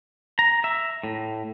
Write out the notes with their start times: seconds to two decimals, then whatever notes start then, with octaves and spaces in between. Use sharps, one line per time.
0.39 A#5
0.64 E5
1.03 A2